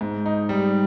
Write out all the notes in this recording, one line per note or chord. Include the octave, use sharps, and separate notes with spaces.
G#2
D#4
G3